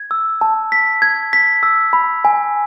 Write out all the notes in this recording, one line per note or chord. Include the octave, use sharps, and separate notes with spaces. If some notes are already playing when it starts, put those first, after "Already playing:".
Already playing: G#6
E6
A5
B6
G#6
B6
E6
B5
G#5